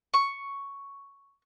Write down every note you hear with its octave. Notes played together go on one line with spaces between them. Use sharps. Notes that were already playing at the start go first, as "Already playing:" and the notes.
C#6